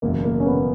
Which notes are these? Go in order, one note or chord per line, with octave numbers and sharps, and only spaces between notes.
F#1 E2 B2 A#3
A#3
C#4
B3